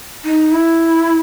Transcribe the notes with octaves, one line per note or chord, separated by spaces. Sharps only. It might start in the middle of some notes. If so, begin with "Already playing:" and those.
D#4
E4